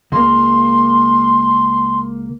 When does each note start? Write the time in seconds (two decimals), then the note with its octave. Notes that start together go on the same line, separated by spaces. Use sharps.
0.12 C#2 A#3 C6